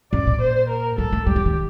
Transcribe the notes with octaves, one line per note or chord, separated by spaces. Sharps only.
F#2 D5
A#2
C5
A#4
F#3 A4
A3
G3 G4
F#3
D#3